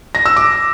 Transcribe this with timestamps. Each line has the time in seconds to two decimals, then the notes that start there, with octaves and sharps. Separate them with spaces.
0.15 A#6
0.26 E6
0.37 D6